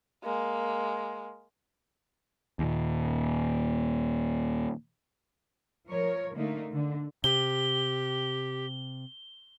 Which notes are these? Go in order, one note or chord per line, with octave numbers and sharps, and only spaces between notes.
G#3 A#3
D#2 A#2
F3 A#4 C#5
D3 A3 A#3 D#4
D3
C3 G4 G7